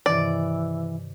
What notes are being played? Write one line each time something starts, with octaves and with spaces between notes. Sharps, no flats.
G2 C3 D#3 E3 D5